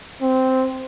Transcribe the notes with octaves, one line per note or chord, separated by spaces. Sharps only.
C4